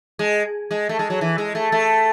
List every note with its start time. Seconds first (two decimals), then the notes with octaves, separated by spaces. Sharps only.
0.19 G#3
0.71 G#3
0.89 A3
0.99 G#3
1.10 F#3
1.21 E3
1.38 G#3
1.55 A3
1.72 A3